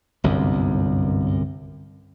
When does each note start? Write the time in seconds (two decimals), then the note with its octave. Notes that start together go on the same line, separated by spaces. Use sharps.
0.24 G1 C2 F#2